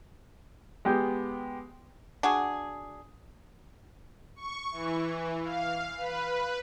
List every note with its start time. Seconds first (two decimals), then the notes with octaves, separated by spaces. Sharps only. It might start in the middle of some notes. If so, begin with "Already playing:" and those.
0.85 G#3 B3 G4 G6
2.23 D4 F#4 G#4
4.36 C#6
4.72 E3
5.43 F5
5.98 B4